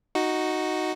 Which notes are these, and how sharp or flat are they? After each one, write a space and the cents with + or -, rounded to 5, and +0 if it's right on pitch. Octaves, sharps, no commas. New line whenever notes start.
D#4 +0 F#4 +0